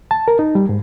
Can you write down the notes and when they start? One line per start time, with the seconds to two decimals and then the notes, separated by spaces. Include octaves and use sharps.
0.11 A5
0.28 A#4
0.39 D#4
0.55 G3
0.69 G#2